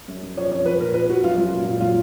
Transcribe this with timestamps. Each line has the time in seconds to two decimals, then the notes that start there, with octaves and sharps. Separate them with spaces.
0.08 F#2
0.23 F#2
0.37 F3 C#5
0.51 F2 C#5
0.66 F3 B4
0.80 A#2 A#4
0.94 F3 B4
1.09 F3 F#4
1.24 F#2 F4
1.38 F#3
1.52 A#2
1.66 A#2
1.80 F#3 F4